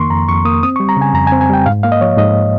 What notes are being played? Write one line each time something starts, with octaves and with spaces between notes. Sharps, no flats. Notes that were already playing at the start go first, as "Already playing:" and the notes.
Already playing: F2 D#3 A#3 C6 C#6
F2 A#5
F2 C#6
A#3 D#6
C4 D#6
C#6
G3
A#5
C#3 G#5
F2 A#5
G#5
C4
G#5
G3 G5
G#2 F5
A#3 F5
D#5
F3 C#5
G#2 D#5